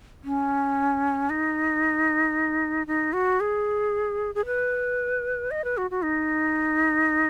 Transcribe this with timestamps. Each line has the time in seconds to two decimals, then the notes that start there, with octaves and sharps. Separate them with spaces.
0.24 C#4
1.30 D#4
2.87 D#4
3.13 F#4
3.40 G#4
4.35 G#4
4.46 B4
5.51 D#5
5.64 B4
5.77 F#4
5.91 F#4
6.04 D#4